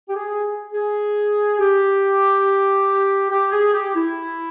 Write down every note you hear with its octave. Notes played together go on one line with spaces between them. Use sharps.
G4
G#4
G#4
G4
G4
G#4
G4
E4